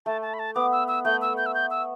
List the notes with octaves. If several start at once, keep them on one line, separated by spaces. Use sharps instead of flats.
A3 A5
A5
B5
A5
B3 D6
E6
E6
A3 G6
E6
G6
E6
G6
E6